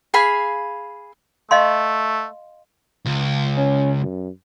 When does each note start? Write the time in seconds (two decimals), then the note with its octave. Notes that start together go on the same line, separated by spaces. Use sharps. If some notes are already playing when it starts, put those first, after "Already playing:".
0.14 G#4 F5 G#5 B5
1.51 A3 D#5 F5 C6
3.06 C#2
3.57 C#4
4.02 F#2